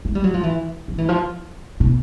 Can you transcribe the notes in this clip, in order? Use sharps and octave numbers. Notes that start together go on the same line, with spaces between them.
G#3
G3
F#3
F3
E3
F3
E3
F3
B2